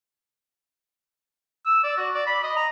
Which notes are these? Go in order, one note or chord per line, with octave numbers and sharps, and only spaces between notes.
E6
D5
F#4
D5
B5
D#5
A#5